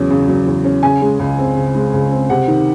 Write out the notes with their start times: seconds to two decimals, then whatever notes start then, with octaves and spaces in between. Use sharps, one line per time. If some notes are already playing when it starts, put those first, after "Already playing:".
Already playing: E2 C#3 F#3 C#4
0.10 C#3
0.28 F#3
0.46 E2
0.64 C#4
0.83 C#3 G#5
1.02 G#3
1.19 C#2
1.39 C4
1.56 C#3
1.75 G#3
1.94 C#2
2.11 C4
2.30 C3 F#5
2.48 D#3